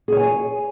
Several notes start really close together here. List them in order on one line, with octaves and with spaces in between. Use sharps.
G#4 C#5 G#5